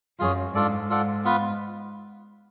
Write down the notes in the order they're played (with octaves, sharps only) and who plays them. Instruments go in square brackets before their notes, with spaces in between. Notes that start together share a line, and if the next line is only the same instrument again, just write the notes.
[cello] F#2 [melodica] F4 G#4 C#5
[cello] G#2 [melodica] D4 F4 A4 D5
[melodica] F4 A4 D5 F#5
B3 F4 B4